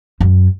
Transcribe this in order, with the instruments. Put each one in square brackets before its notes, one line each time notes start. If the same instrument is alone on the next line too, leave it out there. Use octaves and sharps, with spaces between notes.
[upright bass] F#2